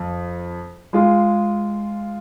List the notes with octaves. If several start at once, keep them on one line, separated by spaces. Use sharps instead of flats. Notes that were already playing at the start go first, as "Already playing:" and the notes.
Already playing: F2
G#3 F4 G#4